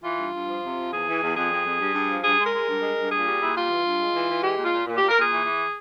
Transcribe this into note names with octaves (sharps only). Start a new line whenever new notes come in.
E3 F4
G2
G2
F3
C3
F3
E2 G#4
E3
E2
F2 G#4
F2
F2
G2
G2
F3
G2 G#4
G#3
A#4
G#3
G2
G#3
G2
A#2 G#4
G3
A#2 E4
G3 F4
E3
G2
G#3
E3
E3
G#3 G4
A#2
F4
A#2
A#2
A#2 G4
A#4
A#2 G#4
E3
E3